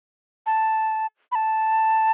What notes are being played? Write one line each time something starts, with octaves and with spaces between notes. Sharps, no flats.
A5
B5
A5